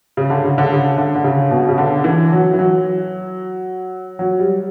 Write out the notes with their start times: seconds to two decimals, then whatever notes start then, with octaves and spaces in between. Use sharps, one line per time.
0.17 C#3
0.30 D3
0.45 C#3
0.58 D3
0.73 C#3
0.98 D3
1.15 D3
1.24 C#3
1.51 B2
1.69 C#3
1.78 D3
2.04 E3
2.32 F#3
2.53 E3
2.59 F#3
4.19 F#3
4.40 G3